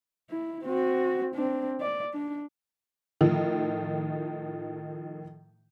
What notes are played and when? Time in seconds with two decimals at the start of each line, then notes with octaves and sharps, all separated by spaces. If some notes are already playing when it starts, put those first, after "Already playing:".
0.30 E4
0.64 C4 F#4
1.35 C4 D4
1.80 D5
2.13 D4
3.21 A2 D#3 F3